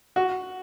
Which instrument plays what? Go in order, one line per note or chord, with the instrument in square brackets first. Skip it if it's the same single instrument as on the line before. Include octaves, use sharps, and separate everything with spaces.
[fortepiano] F#4